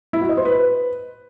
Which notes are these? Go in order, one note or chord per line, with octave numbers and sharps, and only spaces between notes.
E4
F#4
D#5
C5
B4